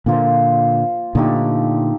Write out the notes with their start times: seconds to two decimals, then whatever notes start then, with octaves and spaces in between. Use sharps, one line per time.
0.06 A#2 D3 F3 A#3 F4 C5
1.15 A#2 D3 F3 A3 D#4 G4